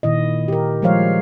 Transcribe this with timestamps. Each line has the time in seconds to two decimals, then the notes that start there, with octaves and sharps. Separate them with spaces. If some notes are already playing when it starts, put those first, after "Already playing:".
0.03 A#2 D#3 E4 D#5
0.48 G4 A#4
0.82 F3 G3 G#3 C5 C#5 F5